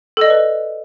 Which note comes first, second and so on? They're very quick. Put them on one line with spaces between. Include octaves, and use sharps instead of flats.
A4 D#5 D5 B4